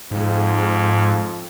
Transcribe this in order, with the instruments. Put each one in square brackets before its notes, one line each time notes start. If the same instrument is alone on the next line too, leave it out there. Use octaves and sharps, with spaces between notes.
[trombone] F2 [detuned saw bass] G#2